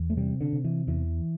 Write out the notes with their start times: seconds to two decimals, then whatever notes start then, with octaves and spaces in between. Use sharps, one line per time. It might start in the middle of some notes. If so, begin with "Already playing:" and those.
Already playing: E2
0.10 A3
0.17 C3 G3
0.41 D3
0.52 C3
0.64 E3
0.87 E2 E3